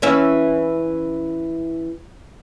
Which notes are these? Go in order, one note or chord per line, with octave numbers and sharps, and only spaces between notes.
E3 C#4 E4